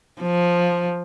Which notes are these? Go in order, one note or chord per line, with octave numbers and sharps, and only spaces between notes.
F3